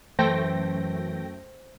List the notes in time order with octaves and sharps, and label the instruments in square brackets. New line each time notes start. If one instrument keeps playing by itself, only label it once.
[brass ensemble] F#2 [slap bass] E3 [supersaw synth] A3 G5 A#6 [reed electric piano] C5